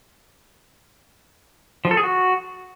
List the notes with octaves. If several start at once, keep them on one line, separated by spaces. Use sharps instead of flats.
F3
A4
G#4
F#4